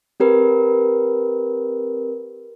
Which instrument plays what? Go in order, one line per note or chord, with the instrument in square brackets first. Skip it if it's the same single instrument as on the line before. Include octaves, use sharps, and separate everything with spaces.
[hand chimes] C4 G4 A#4 B4